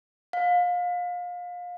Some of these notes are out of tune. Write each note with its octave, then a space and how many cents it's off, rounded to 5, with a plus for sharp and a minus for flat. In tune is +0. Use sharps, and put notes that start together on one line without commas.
F5 +30